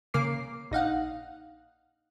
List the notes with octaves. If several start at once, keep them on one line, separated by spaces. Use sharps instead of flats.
C#3 A#3 D6 C7
A#1 D#4 F5 F#5